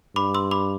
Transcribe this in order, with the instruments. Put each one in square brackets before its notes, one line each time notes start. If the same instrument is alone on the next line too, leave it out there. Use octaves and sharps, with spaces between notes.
[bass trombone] G2 [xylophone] B5 D6
[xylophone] C6 E6
B5 D6